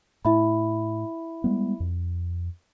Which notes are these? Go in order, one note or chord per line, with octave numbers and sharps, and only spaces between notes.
A2 E4 E5 B5
G3 G#3 B3
F2